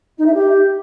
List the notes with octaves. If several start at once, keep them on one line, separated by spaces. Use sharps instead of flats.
D#4
E5
G4